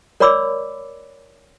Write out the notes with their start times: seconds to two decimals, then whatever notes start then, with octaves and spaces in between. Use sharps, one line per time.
0.20 A#4 C#5 D5 B5 D6 E6